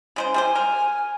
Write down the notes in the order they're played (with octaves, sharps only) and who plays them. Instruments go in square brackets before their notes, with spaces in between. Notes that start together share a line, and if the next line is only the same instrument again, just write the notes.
[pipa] C#3 G#3 C5
[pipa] G3 G#4 C5 [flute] G#5
[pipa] A#4